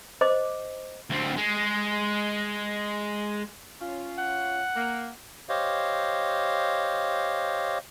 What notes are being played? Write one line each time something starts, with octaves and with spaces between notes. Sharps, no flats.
C5 D#5 D6
D2 C4
G#3
C#4 F4
F#5
A#3
G4 C5 C#5 D#5 F5